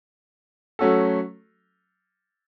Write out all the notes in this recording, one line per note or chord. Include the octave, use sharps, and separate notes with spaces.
F#3 A3 C#4 F#4 A4